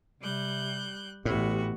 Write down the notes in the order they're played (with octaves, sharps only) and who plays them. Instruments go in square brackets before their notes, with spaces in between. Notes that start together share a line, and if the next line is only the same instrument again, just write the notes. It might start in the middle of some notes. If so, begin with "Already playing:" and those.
[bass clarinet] C3 [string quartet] G3 F#6 G6
[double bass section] A1 [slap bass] A2 [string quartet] B3 F#4 [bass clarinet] G4